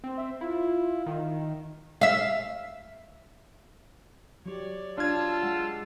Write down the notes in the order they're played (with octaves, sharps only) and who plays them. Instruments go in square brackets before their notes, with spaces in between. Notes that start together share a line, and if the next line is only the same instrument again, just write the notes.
[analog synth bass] C4
[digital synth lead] E5
[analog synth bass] E4 [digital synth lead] F4
[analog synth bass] D#3
[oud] E5 F5
[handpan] F#3 G4 [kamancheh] C#5 D5
[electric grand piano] D4 G#6 [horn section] F4 [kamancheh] A5 E6
[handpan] G#3 F#5